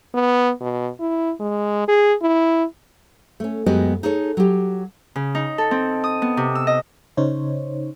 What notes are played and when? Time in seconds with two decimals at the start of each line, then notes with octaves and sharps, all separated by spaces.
0.14 B3
0.61 B2
0.99 E4
1.40 G#3
1.88 G#4
2.22 E4
3.40 A3 C#4
3.66 F#2 G#3 B3 F#4 G4 D#5
4.03 D#4 G#4 A4 C#5
4.37 F#3 G4
5.16 C#3
5.35 D#4
5.58 A4
5.71 C4
6.04 D#6
6.22 B3
6.37 C3
6.55 E6
6.67 D#5
7.17 C#3 D#4 C5 C#5